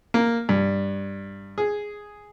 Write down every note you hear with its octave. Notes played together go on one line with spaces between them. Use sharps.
A#3
G2
G#4